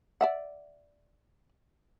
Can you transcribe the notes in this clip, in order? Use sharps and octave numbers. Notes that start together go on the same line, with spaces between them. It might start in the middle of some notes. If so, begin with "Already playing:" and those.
D5 E5 F#5